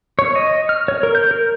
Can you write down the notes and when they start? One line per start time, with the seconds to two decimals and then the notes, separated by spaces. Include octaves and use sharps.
0.19 C#5
0.36 D#5
0.69 F6
0.88 C#5
1.03 A#4
1.15 G6
1.31 A#4